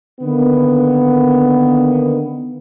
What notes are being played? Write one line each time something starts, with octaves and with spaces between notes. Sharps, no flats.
D3 D#3 A#3 B3